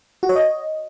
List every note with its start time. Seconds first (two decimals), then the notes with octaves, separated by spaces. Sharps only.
0.23 F#4
0.29 C#5
0.36 D#5